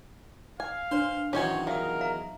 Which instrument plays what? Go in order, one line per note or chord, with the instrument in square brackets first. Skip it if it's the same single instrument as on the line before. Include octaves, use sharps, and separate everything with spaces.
[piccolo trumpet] F5 [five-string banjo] G#5
[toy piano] D4 B4 [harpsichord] C5
[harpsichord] E2 D#3 F#3 [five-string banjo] C#4 C5 G#5 [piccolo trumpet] C#5
[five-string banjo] F3 [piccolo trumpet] A#4 [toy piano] E5 F5 D#6
[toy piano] E5 F5 A#5